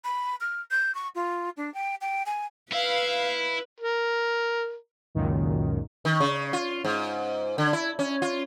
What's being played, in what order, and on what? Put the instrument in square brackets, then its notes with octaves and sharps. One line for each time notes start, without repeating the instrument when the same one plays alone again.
[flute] B5
F6
G6
C#6
F4
D4
G5
G5
G#5
[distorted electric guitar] E4 [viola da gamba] B4 [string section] F5
[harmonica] A#4
[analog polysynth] C#2 F#2 A#2 D#3
[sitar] D#3
C#3
F4
G#2
D3
E4
C#4
F4